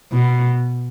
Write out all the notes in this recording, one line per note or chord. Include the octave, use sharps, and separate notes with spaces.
B2